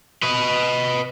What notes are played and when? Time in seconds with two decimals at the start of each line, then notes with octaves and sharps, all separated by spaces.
0.23 B4 D#5